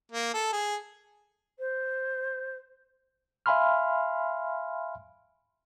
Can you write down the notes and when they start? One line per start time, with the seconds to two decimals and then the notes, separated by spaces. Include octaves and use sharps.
0.12 A#3
0.34 A4
0.53 G#4
1.59 C5
3.46 E5 F5 G#5 B5 C6 F6